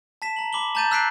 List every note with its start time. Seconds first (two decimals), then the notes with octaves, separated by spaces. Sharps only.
0.22 A5 B6 E7
0.36 A#5 F#7
0.53 B5 D6 F#7 G7
0.75 A5 A#5 G6 A6 D#7
0.91 E6 F#6 B6 C7 D7